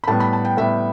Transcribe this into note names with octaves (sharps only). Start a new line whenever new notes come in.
B5
A2 G3 B3 A5
B5
A5
G5
A2 G3 B3 E5